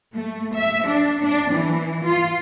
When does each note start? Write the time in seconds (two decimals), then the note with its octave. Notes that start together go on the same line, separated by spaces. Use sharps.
0.16 A3
0.56 E5
0.88 D4
1.23 D4
1.53 E3
2.05 F4